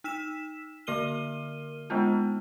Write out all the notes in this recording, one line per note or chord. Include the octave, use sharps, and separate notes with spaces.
D#4 E6 B6 E7
D3 A#3 A#4 F6 D#7 G7
G#3 B3 D4 D#4 F4